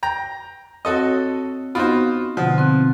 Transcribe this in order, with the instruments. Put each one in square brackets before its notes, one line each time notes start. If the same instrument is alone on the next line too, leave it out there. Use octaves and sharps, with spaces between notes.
[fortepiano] G5 A#5
[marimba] C4 C#5 [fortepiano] F#4 A4 D#5
[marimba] B3 D#4 D#5 [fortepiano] F4 F#4 C5
[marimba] B2 D3 F#5 [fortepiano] F3
[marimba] C4 F#6